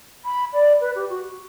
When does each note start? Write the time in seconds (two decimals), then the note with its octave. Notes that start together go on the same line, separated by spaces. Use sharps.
0.25 B5
0.53 D5
0.81 B4
0.95 G4
1.09 F#4